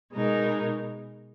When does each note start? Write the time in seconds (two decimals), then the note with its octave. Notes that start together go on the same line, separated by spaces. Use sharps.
0.13 B2 G#3 D#4 A#4